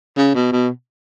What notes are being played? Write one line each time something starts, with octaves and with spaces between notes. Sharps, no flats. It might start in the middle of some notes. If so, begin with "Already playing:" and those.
C#3
B2
B2